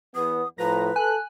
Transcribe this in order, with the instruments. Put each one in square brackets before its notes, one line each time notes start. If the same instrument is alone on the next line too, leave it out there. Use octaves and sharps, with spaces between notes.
[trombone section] E2 B3 [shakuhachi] D#6
[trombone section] A2 F3 [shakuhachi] B4 [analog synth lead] A#5
[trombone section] A4 [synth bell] G#5 [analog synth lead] F#6